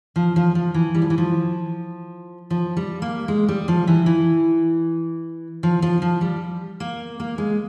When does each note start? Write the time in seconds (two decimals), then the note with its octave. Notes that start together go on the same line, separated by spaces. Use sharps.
0.16 F3
0.36 F3
0.55 F3
0.74 E3
0.95 G3
1.02 F3
1.10 E3
1.18 F3
2.50 F3
2.77 G3
3.02 A#3
3.28 G#3
3.48 G3
3.68 F3
3.87 E3
4.06 E3
5.63 F3
5.82 F3
6.02 F3
6.21 G3
6.80 A#3
7.20 A#3
7.38 G#3